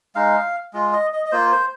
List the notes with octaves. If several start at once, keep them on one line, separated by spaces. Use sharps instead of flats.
G#3 D#4 F5
G#3 F4
D#5
D#5
D#5
A#3 F4 C5
C5